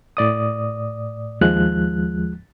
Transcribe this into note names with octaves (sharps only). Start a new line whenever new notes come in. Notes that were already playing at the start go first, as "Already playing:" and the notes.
A2 D5 D#6
D#2 F3 G#3 F#6